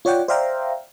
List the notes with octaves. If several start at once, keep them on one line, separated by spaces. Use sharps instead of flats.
F4 C#5 D5 F#5 G5
C5 D5 E5 F5 G5 A#5